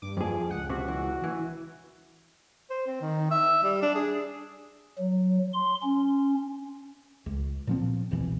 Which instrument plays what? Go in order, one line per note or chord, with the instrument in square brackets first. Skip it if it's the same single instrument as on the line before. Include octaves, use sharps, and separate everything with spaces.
[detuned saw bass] G2 [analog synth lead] D6
[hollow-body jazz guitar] F2 G#4 [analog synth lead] F3
[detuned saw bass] C#2 [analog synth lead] F#5
[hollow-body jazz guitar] C3 [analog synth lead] F#4
[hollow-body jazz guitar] E3
E3
[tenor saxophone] C5
C4
D#3
E5
G3
D4
G#4
[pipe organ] F#3
C6
C#4
[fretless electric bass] C#2
A#2 F3 C4
E1 C2 B2 E3